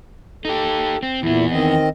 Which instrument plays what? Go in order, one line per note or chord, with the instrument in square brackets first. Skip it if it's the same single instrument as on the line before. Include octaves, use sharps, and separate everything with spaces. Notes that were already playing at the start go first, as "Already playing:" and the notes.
[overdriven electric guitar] D#4 G4 [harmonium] A4
[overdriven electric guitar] C4
[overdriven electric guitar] E2 B3 [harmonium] A#2 E4
[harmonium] D#3 C4 D#5